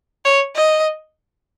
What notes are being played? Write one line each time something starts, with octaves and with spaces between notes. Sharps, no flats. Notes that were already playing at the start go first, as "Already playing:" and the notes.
C#5
D#5